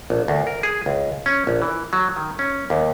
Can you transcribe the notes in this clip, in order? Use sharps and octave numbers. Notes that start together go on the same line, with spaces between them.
A#1
D2
A#4
G#4
C#2
C#4
A#1
E3
F#3
D#3
C#4
D#2